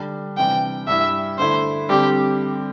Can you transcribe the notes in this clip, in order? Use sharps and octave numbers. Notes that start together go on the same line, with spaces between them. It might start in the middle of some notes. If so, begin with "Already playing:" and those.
Already playing: D3 G3 D4
C3 E3 G3 D4 G5
G2 G3 E4 E5
D3 A3 E4 C5
D3 G3 C4 G4